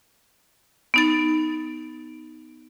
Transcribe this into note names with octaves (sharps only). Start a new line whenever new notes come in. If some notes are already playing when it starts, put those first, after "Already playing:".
B3 D#4 A6